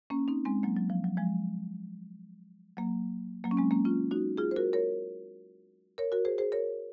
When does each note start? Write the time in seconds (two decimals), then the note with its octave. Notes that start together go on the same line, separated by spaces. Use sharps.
0.10 A#3 C#4
0.28 C4 D#4
0.45 G#3 C4
0.63 F#3 A#3
0.76 F#3
0.90 F3
1.04 F#3
1.17 F3 G#3
2.77 F#3 A#3
3.44 F#3 A#3
3.51 C#4
3.57 G#3 C4
3.71 A#3 C#4
3.85 C#4 F4
4.11 D#4 F#4
4.38 F4 G#4
4.51 C5
4.56 F#4 A#4
4.73 A#4 C#5
5.98 A#4 C#5
6.12 F#4 A#4
6.25 G#4 C5
6.38 G#4 C5
6.52 A#4 C#5